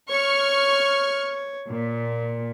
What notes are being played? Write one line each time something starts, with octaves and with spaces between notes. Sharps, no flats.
C#5 C#6 F6
A#2